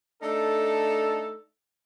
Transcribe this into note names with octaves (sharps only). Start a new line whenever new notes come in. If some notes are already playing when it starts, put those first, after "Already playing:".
A3 D4 D#4 A4